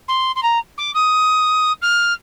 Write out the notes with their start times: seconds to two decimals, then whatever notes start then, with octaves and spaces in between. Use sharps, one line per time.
0.08 C6
0.36 C6
0.43 A#5
0.78 D6
0.94 D#6
1.82 F6